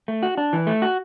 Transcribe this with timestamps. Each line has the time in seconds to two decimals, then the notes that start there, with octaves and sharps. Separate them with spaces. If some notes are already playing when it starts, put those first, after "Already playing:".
0.08 A3
0.23 F#4
0.38 D4
0.53 E3
0.67 A3
0.82 F#4